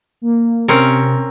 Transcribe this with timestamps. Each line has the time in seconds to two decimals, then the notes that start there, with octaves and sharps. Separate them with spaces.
0.22 A#3
0.68 C3 C4 C#4 A#4